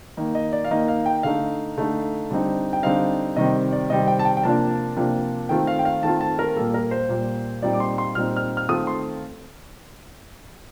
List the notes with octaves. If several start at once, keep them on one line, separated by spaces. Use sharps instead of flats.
D#3 A#3 D#4
D#5
D5
F5
D#3 A#3 D#4 D#5
F5
G5
D3 A3 D#4 F5
D3 A3 D#4
D3 G3 C4 D#4
G5
D3 G3 C4 D#4 F5
C3 D#3 G3 C4 D#5
D5
C3 D#3 G3 C4 D#5
G5
A5
G5
G5
C3 F3 A#3 D4 F4 A5
C3 F3 A#3 D4 F4
D#3 A3 C4 F4 G5
F5
G5
F5
D#3 A3 C4 F4 A5
A5
A#4
A#2 G3 A#3 A4
A#4
C5
A#2 G3 A#3
A#2 G3 C4 D#4 D5
D6
C6
C6
A#2 G3 C4 D#4 F6
F6
F6
D#3 A3 C4 F4 D#6
C6